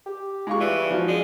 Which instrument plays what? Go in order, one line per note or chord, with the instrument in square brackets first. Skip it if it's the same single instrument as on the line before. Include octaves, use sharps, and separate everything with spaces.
[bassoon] G4
[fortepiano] G#3 F4 C#6
[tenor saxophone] E3 [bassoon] G3
[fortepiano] F3 F#3
[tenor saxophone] G#3 [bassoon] D4